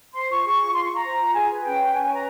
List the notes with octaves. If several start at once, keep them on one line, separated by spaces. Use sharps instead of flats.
C5 C6
F4 C#6
G#4 C#6
F4
F4 C6
F4 C#6
A#5
C5
F4
G#4 G#5
B4
C#4 G5
B4
C#4 G#5
G#5
B4 A#5